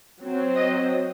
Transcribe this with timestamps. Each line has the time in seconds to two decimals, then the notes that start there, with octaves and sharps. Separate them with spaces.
0.20 F#3 C4
0.54 D#5